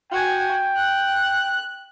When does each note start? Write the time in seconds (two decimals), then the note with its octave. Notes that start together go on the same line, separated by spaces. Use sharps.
0.11 F#4 G5 G#5
0.76 F#6